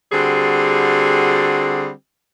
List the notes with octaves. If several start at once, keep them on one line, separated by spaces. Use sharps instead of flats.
D3 G3 C4 F#4 G#4